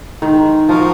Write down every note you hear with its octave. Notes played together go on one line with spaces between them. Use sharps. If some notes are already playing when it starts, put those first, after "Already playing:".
D#3 G#3
F3 D#4 F#4 A#4 F5